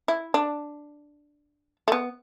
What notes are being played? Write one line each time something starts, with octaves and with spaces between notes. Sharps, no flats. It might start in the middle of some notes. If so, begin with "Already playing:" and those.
E4
D4
A3
B3